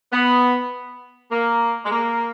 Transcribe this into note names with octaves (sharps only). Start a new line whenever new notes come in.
B3
A#3
G#3
A#3